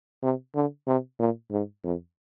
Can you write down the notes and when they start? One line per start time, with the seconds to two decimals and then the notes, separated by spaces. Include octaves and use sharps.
0.23 C3
0.55 D3
0.87 C3
1.19 A#2
1.51 G#2
1.84 F2